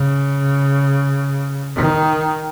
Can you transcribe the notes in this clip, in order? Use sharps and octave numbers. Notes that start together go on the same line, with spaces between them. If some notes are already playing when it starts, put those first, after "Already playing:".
Already playing: C#3
D#3